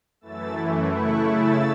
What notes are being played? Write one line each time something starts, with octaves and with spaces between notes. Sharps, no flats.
F#2 E3 A3 E4 E6 A6
C#3 A3 E4 C#6 F#6
E6 A6